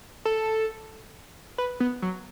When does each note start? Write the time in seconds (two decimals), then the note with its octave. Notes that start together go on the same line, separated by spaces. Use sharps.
0.25 A4
1.58 B4
1.80 B3
2.02 F#3